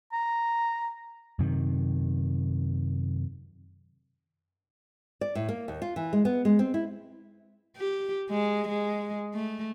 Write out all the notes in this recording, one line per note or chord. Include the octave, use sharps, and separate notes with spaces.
A#5
F#2 C3 D#3
D5
A2
A#3
D#2
F4
E3
G#3
B3
G#3
C4
E4
G4
G#3
G#3
A3